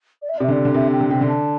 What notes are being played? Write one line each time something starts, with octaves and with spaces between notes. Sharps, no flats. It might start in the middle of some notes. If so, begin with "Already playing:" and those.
D5
E5
D5
C3
E5
D3 D5
D3
C3 E5
G5
D3
C3 G5
D3
A5